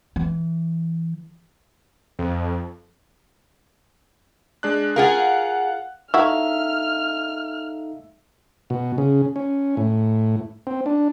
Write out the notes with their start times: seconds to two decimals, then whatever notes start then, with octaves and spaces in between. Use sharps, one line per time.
0.16 E3
2.19 F2
4.63 G#3 D4 F#6
4.96 F4 G#4 A#4 F5 F#5
6.14 D#4 E4 F#4 A4 E5 F5 E6 F6
8.70 B2
8.98 C#3
9.36 C#4
9.77 A2
10.67 C4
10.86 D4